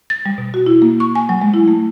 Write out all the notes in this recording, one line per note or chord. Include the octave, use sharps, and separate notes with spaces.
A6
G3
B2
F#4
E4
A#3
C#6
G#5
F#3
G#3
E4
A3